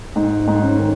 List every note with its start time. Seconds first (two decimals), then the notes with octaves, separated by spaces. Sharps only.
0.16 G#2 D#4
0.40 D#4
0.47 G#2
0.63 C#4
0.79 D#3